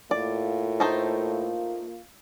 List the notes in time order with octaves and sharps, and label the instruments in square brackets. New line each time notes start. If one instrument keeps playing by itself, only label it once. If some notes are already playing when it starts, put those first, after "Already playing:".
[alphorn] A2 [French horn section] A#3 F4 [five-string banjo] D5
[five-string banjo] A3 D#4 C5